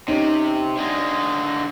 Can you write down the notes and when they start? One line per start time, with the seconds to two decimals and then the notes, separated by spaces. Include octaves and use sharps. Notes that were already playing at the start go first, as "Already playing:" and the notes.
0.08 C3 C#4 D#4
0.77 D3 G#3